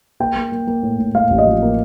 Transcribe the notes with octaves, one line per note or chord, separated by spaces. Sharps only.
A#3 G5
A#3
A#3
A#3
A2
A2
A2 F5
A1
D#5
F3
A#3